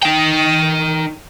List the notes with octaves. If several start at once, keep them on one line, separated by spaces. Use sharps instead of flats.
D#4 G5